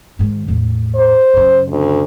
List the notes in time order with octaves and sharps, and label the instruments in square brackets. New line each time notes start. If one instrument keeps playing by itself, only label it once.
[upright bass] G#2 D#3
E2 A2
[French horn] C5
[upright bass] F#2 C#3
[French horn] D2